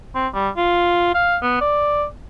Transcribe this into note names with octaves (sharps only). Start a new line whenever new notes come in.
C4
G3
F4
F5
B3
D5